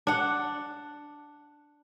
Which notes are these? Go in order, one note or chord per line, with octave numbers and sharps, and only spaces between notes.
D4 F#5